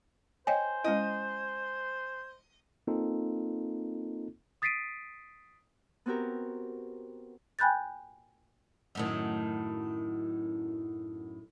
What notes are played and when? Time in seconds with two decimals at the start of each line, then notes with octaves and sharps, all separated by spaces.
0.47 C5 C#5 D#5 G5 G#5
0.84 G#3 C#4 E4 D#5
2.87 A#3 C4 D#4 F4 A4
4.62 D#6 A6 B6 C7 D7 D#7
6.06 B3 C4 F#4 G4 A#4
7.59 G5 G#5 B5 F#6 G6 A6
8.95 F#2 A2 D#3